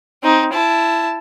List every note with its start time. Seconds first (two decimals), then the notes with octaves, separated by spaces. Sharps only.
0.23 C4 D#4
0.53 E4 A5